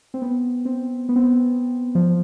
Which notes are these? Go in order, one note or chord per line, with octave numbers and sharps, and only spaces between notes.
C4
B3
C4
B3
C4
B3
F3